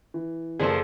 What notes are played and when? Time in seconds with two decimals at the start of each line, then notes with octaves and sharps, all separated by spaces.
0.14 E3
0.60 F#1 F#2 A#2 F3 A#3 G#4 A4